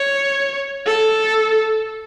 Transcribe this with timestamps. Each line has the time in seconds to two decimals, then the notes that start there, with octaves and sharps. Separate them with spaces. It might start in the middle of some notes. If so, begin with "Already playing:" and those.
Already playing: C#5
0.86 A4